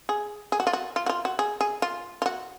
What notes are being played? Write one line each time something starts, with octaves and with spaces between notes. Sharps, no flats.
G#4
G#4
F#4
F4
F#4
F4
F#4
F4
F#4
G#4
G#4
F4
F4
F#4